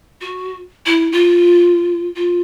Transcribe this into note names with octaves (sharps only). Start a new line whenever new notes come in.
F#4
E4
F4
F4